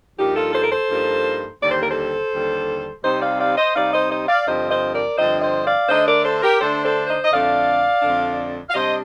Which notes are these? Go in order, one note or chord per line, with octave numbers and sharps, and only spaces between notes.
G2 F3 A#3 D#4 G4
F4 A4
A4 C5
A#4
A4 C5
G2 F3 A#3 D#4
D#2 D3 G3 D5
C5
A#4
A4 C5
D#2 D3 G3
C3 G3 C4 D#4 C5 D#5
D5 F5
D5 F5
C5 D#5
C3 G3 C4 D#4 D5 F5
C5 D#5
C5 D#5
D5 F5
G2 D3 F3 C4 C5 D#5
C5 D#5
A#4 D5
G2 D3 F3 C4 C5 D#5
C5 D#5
D5 F5
D3 A3 D4 C5 D#5
A#4 D5
A4 C5
G4 A#4
D3 A3 D4 A4 C5
A4 C5
C5 D#5
D#5
F2 D3 A3 D4 D5 F5
F2 D3 A3 D4
F5
C3 G3 D4 C5 D#5